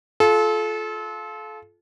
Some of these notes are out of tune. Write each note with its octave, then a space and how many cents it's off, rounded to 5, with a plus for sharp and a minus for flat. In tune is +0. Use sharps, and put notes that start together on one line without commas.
F4 +0 A4 -30